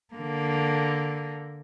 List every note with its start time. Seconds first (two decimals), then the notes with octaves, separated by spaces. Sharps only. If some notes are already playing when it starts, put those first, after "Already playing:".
0.14 D3 A#3